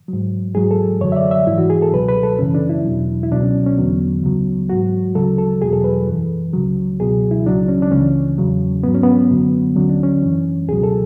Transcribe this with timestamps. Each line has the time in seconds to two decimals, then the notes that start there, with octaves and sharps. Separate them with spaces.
0.08 G#2 F#3
0.55 G#2 F#3 G#4
0.71 A4
1.01 F#2 D3 F#3 C#5
1.12 E5
1.16 D5
1.31 E5
1.47 G#2 E3 E4
1.58 F#4
1.70 G#4
1.82 A4
1.93 C#2 B2 F#3 B4
2.09 B4
2.23 A4
2.39 F#2 C#3 E3 C#4
2.55 D4
2.70 E4
2.85 E2 B2 F#3
3.23 E4
3.31 C#2 B2 F#3 D4
3.43 C#4
3.66 C#4
3.78 E2 D3 F#3 B3
4.23 C#2 C#3 F#3
4.70 G#2 F#3 F#4
5.15 D2 C#3 F#3 A4
5.38 A4
5.62 E2 B2 F#3 G#4
5.73 A4
5.84 B4
6.07 F#2 E3
6.53 C#2 C#3 F#3
7.00 C#2 B2 F#3 G#4
7.31 E4
7.46 C#2 C#3 F#3 D4
7.68 C#4
7.82 D4
7.91 C#2 C#3 E3 C#4
8.38 E2 C#3 F#3
8.83 G#2 F#3 B3
8.95 C#4
9.03 B3
9.31 F#2 D3 F#3
9.76 D2 D3 F#3 C#4
9.89 D4
10.03 C#4
10.22 F#2 E3
10.68 C#2 B2 F#3 G#4
10.83 A4